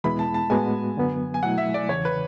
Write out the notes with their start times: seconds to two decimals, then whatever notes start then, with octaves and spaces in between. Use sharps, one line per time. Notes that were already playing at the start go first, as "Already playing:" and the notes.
0.04 E2 B2 G#3 B3 E4 B5
0.19 A5
0.34 A5
0.50 A2 G#3 B3 F#4 G#5
0.97 F#2 D3 F#3 B3
1.34 G#5
1.43 B2 F#3 A3 E4 F#5
1.58 E5
1.74 D5
1.89 E2 C#3 E3 C#5
2.05 B4